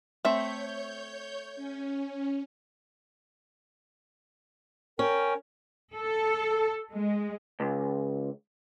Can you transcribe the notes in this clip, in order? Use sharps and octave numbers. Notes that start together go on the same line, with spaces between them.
A3 C4 C#5 E5 G6
C#4
C#4 A#4 G5
A4
G#3
C#2